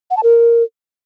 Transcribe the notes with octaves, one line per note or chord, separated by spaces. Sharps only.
F#5
A5
A#4